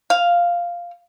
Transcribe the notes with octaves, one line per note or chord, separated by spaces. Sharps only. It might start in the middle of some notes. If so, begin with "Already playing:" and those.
F5